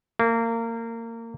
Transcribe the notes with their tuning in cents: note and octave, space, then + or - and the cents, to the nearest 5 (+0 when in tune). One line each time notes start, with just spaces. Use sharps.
A#3 -25